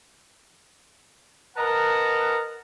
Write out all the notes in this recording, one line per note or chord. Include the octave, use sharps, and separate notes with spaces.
A#4 B4 D#5 F#5 A5 A#5